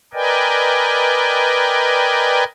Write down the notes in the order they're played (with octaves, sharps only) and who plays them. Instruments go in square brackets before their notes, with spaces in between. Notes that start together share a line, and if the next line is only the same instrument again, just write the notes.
[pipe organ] A#4 B4 D5 D#5 G5 G#5